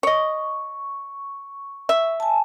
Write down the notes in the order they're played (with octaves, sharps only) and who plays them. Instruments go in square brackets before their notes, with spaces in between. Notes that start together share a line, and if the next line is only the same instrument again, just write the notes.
[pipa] C#5 D#5 [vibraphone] C#6
[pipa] E5
[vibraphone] G#5 A5